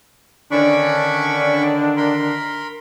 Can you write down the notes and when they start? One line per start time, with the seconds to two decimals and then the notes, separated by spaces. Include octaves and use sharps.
0.51 D3 D#3 C#4 D4 B5 C#6
1.97 A#4 B5 C6